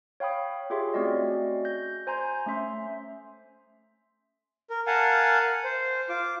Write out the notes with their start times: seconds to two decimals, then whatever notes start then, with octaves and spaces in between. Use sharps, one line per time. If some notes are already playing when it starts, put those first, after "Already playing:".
0.20 C#5 F5 G5 B5 D#6
0.70 F4 G4 G#4 C#5 E5 C6
0.94 A3 C4 C#4 F#4 D5 D#5
1.65 G6 A#6
2.07 C5 G#5 A#5 C6 G6
2.46 A3 C#4 E5 C6
4.70 A#4
4.87 A#4 F5 F#5 G#5 A5
5.64 C5
6.09 F4 D6